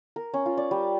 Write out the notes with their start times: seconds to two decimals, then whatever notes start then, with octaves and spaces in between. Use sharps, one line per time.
0.16 A#4
0.34 C#4
0.46 F4
0.57 D5
0.71 G3